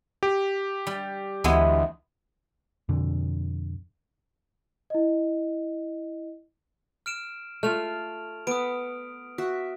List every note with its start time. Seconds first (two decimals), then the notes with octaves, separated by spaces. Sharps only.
0.23 G4
0.87 G3
1.44 D2 E3 G#3 B3
2.89 F2 B2 D3
4.90 E4 D#5
7.06 F6 D7 E7
7.63 A3 F4 F6 F7
8.47 B3 D#6 D7
9.38 F#4 E5